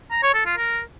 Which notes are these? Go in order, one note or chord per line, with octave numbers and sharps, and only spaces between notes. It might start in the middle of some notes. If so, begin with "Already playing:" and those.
A#5
C#5
A4
F4
A#4